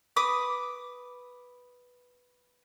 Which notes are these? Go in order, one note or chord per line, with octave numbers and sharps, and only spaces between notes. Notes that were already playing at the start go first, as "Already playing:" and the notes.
B4 D6 D#6